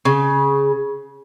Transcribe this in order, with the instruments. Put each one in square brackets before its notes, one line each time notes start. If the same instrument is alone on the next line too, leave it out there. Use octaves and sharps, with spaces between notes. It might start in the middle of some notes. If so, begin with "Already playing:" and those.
[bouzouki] C#3